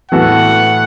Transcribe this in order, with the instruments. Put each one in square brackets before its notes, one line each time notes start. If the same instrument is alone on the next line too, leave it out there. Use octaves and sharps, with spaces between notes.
[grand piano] A2 E3 B3 F#4 A4 [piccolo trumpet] F#5